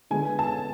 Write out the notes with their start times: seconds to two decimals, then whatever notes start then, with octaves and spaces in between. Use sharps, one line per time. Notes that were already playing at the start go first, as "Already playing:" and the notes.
0.11 D3 G#3 B3 G#5
0.39 A5